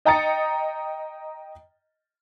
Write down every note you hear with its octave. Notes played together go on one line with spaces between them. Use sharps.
D#5 G5 A#5 D#6 A6 C#7